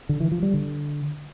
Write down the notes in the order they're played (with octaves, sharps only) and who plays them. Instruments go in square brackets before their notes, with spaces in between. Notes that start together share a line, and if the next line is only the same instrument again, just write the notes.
[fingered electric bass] D3
E3
F3
G3
D3